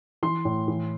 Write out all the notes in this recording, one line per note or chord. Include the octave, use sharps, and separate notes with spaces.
E3 C6
A2
E3